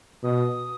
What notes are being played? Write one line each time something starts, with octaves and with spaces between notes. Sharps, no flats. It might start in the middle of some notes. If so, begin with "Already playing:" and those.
B2 D#6